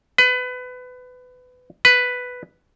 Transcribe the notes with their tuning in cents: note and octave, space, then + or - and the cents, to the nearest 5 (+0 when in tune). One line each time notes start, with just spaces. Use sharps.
B4 +25
B4 +5